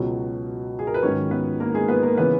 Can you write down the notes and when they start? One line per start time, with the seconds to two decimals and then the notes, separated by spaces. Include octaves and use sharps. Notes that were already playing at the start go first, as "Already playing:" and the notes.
Already playing: C#2 B2 F#3
0.79 G#4
0.87 A#4
0.94 B4
1.03 G#2 D#3 F#3 C#4 C#5
1.31 B3 B4
1.60 A#3 A#4
1.74 G#3 G#4
1.88 B3 B4
2.03 A#3 A#4
2.17 C#3 E3 B3 B4